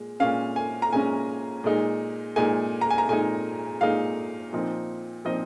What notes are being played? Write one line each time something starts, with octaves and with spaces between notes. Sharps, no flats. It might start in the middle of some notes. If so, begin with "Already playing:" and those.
Already playing: A#2 G#3
A#2 G#3 C#4 F5
G#5
A#5
A#2 G#3 C#4 G#5
A#2 G#3 D#4
A#2 G#3 D#4 G#5
A#5
G#5
A#5
A#2 G#3 D#4 G#5
A#2 G#3 D#4 F5
A#2 F3 C4 D#4
A#2 F3 C4 D#4 D#5